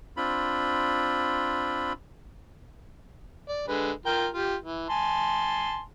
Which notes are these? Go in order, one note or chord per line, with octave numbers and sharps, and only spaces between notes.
C4 D4 F4 B5
D5
D3 G#3 B4
F4 A#4 G5
F4 G4
E3
G#5 A5 C6